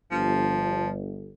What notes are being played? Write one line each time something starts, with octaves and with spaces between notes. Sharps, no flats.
G1 F3